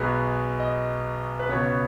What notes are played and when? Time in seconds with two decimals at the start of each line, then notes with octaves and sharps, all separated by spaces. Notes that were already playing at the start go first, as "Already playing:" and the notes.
Already playing: B1 B2 G#3 B3 G#5
0.60 D#5
1.39 B4
1.49 C#2 B2 B3 C#5